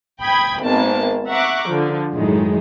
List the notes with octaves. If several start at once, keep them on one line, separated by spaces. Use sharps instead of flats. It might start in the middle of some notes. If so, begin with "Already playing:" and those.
G5 B5 D#6 G#6
G#1 A#3 B3 A5
E5 F#5 A#5 C#6 D6 F#6
D3 F3
F#2 A2 D#3 F#3 G#3